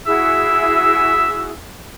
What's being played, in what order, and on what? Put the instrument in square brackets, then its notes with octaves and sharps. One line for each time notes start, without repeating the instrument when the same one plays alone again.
[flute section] E4 F#4 G#4 [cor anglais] E5